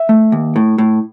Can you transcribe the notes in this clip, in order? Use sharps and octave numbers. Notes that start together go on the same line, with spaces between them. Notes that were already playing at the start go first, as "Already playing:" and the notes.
Already playing: E5
A3
D#2
A2
A2